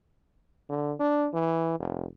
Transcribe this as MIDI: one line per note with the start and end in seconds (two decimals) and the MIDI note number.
0.69 0.92 50
1.00 1.28 62
1.33 1.77 52
1.79 2.06 29